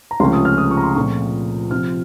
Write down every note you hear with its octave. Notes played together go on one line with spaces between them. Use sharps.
A#5
C#2 C3 F3 A3 C#4 C6
D#6
F6
D#6
C#6
A#5
C6
A#2 F3 A3 C4 C#6
C3 F3 C4 F6